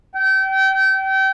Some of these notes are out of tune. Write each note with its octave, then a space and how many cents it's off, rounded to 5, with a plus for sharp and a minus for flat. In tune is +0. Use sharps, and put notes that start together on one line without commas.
G5 -30